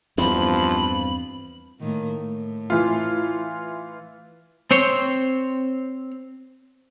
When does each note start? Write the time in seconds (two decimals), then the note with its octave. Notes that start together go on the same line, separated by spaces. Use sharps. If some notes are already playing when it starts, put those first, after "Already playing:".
0.18 E2 G2 F3 C4 B5
1.80 A2 D#3 A#3
2.18 A2
2.70 E3 F4
4.71 C4 C5 C#5